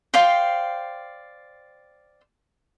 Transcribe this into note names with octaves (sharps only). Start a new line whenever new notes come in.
C5 D5 F5 G5